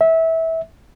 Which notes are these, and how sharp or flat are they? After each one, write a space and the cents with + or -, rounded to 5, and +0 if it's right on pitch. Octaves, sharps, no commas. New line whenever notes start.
E5 -20